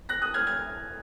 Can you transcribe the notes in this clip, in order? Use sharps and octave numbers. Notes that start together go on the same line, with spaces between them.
F#6 A#6
D#6 F#6
F6 G#6
F6 G#6